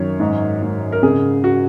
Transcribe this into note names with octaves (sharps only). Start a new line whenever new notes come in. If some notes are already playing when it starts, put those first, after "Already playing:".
Already playing: F#2 D#3 C#5
G#2
G#2
A#4
C#3 G#4
F#4